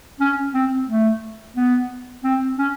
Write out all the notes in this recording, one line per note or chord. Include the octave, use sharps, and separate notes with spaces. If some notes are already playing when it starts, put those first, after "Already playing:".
C#4
C4
A3
B3
C4
C#4